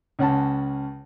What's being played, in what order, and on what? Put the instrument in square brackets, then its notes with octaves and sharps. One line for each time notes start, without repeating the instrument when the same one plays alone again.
[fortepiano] C#2 C#4 F#5 A5